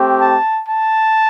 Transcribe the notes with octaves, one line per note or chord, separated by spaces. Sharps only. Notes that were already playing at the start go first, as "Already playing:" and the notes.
Already playing: A3 C4 G4
A5
A5